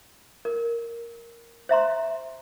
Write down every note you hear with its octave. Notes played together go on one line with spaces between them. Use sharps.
A#4
C5 E5 A#5 C6